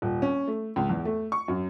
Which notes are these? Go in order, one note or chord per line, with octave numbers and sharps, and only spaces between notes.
D#1
C#4
A3
C#2
E2
A3
C#6
F#2